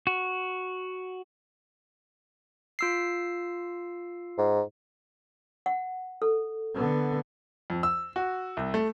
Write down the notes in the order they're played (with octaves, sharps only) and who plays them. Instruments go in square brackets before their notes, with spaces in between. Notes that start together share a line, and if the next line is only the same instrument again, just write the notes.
[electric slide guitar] F#4
[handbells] F4 E6 C7
[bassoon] G#2
[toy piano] F#5
A4
[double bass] D3 B3
[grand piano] F2
E6
F#4
C2
A3